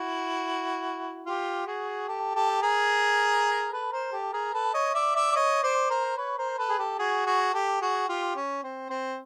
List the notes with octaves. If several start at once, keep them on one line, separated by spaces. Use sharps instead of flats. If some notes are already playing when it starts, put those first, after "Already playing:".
Already playing: E4 F#4
F4 G4
F#4 G#4
G4 A4
G4 A4
G#4 A#4
A4 B4
A#4 C5
G4 A4
G#4 A#4
A4 B4
C#5 D#5
D5 E5
D5 E5
D5
C#5 D#5
C5 D5
A#4 C5
B4 C#5
A#4 C5
A4 B4
G#4
G4 A4
F#4 G#4
F#4 G#4
G4 A4
F#4 G#4
F4 G4
C#4
C4
C4